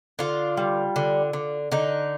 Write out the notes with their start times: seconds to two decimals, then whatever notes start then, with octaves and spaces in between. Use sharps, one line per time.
0.19 D3 F4
0.57 G3
0.96 D3
1.33 D3
1.72 D3 D#4